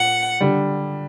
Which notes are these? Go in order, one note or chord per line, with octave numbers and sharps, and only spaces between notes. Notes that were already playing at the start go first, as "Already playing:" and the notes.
Already playing: A#2 F#5
D3 G3